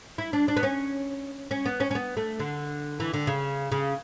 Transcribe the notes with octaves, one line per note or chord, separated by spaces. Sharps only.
E4
D4
D4
B3
C#4
C#4
B3
C#4
C#4
B3
A3
D3
E3
D3
C#3
C#3